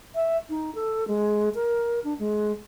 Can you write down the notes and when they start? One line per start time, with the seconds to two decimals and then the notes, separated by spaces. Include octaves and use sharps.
0.15 E5
0.50 D#4
0.75 A4
1.08 G#3
1.55 A#4
2.04 D4
2.19 G#3